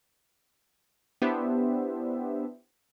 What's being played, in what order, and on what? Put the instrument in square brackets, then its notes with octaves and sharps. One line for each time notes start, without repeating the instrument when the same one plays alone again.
[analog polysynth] B3 D4 E4 G4 C5 E5